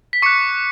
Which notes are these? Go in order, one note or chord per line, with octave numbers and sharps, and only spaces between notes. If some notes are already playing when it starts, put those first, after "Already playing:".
B6
C#6 D6 F#6 C#7